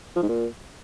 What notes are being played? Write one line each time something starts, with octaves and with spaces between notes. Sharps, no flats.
F3
G#2
A#2